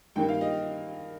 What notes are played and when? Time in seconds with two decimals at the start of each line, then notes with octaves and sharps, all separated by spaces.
0.16 G2 D#3 A#3 G5
0.29 F5
0.41 D#5